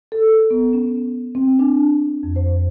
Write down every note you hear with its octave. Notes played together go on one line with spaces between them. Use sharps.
A4
B3
C#4
C4
D4
F2
C5